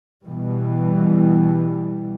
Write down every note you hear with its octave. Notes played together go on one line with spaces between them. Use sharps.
B2 E3 G3